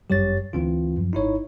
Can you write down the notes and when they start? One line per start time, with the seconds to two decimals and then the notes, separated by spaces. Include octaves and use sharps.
0.10 G1 F#2 G3 G4 C#5 A6
0.53 D2 E3 C4 F4
0.97 F#2 F3
1.13 G#1 D#4 E4 C#5